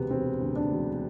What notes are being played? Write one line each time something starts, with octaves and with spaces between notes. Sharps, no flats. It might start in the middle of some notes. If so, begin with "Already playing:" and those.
Already playing: E1 D2 C3 B3
E1 C4
D2
D4
E1